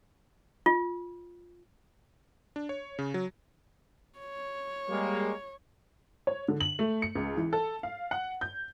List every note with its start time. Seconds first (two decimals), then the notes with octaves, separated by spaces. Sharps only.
0.66 F4
2.56 D4
2.69 C#5
2.99 C#3
3.14 F#3
4.18 C#5
4.89 G3 G#3 A#3
6.27 C#5
6.48 D3
6.61 F#7
6.79 A3
7.02 C#7
7.16 C#2
7.37 E3
7.53 A4
7.83 F5
8.11 F#5
8.41 G6